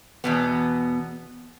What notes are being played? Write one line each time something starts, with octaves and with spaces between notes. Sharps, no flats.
E2 B2 B3